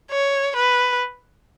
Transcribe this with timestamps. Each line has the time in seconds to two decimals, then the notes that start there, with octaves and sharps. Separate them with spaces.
0.11 C#5
0.56 B4